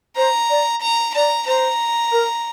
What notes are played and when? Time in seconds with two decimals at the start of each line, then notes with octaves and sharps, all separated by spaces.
0.17 C5 A#5
0.50 D5
0.82 A#5
1.15 D5 A#5
1.47 C5 A#5
2.12 A#4